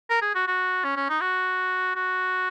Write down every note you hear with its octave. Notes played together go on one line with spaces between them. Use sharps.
A#4
G#4
F#4
F#4
C#4
C#4
D#4
F#4
F#4